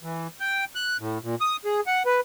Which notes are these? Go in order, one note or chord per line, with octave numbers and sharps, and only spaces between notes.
E3
G5
F#6
A2
A#2
D#6
G#4
F#5
B4